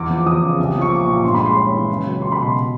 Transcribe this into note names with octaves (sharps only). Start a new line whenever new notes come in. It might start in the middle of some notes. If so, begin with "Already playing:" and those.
Already playing: E2 D6
F3
E2 D#6
C#3
C2
F3
C#6
A#3 D6
A#2
G2 C6
B5
G#3
C6
C#4 B5
E3
C#2
F#3
C#2 C6
B5
B2 C6